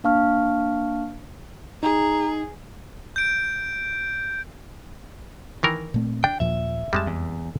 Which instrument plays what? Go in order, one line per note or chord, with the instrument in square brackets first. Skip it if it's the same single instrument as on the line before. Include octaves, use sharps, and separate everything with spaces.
[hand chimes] A#3 D4 F5 A5 C#6 F6
[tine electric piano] D#4 [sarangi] G#4 [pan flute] A#5
[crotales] G6 D7
[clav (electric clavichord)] D#3 E3 A#4
[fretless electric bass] A#2 A3 C4
[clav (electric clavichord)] D4 [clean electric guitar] G5
[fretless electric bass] D#2 A#2 F3 [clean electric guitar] E5
[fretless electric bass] F2 [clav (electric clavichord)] G3 G#3 A5
[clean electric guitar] E2